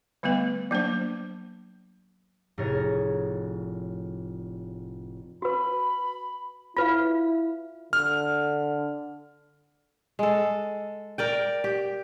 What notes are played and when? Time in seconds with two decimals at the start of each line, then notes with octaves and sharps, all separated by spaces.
0.23 D3 G3 A3 B3 B4
0.71 F#3 A#3 D4 C5
2.58 F1 A2 G#4 A#4 C#5 A6
5.42 F#4 B4 B5
6.77 E4 F4 B4 F5
7.93 D3 F6
10.19 G#3 A4
11.18 A#4 D5 G5
11.64 G4